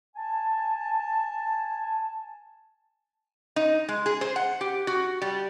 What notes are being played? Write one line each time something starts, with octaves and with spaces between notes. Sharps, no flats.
G#5 A5
D#4
G#3
G#4
C5
F#5
G4
F#4
G3